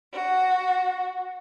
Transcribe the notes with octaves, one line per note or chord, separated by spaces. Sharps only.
F#4